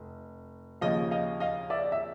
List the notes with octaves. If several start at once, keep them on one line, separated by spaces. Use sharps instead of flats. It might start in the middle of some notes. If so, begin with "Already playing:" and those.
Already playing: F1
D#2 C#3 F3 D#5 F5
D#5 F5
D#5 F5
D5 E5
E5